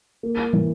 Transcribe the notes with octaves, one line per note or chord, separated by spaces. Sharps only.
A#3
E3